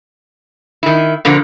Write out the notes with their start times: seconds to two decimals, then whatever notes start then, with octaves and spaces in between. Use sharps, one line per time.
0.83 D#3 E4
1.25 B2 D3 F3 A#3